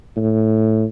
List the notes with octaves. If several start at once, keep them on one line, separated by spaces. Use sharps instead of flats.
A2